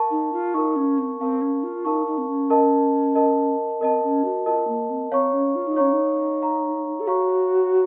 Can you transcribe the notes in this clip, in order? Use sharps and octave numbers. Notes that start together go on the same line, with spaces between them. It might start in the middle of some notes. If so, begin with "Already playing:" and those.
Already playing: A#4 F5 A5 C#6
D#4
F4
D#4 A#4 F5 A5 C#6
C#4
C4
C4 A#4 F5 A5 C#6
C#4
F4
D#4 A#4 F5 A5 C#6
D#4
C4
C#4
A#4 D#5 A5
A#4 D#5 A5
C4 A#4 D#5 A5
C#4
F#4
F4 A#4 D#5 A5
A#3
C4
C4 C#5 F5 A#5 C#6
C#4
F4
D#4
C#4 C#5 F5 A#5 C#6
D#4
C#5 F5 A#5 C#6
A4
F#4 C#5 F5 A#5 C#6